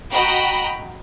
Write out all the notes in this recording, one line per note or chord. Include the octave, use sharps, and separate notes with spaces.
F#4 D#5 F#5 G5 A#5 B5